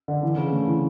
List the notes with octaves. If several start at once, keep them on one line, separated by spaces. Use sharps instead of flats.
D3
E3
C#3
A3
E3